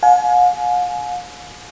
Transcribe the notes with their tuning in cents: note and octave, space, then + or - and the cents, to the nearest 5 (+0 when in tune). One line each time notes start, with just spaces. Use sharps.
F5 +45 G#5 +30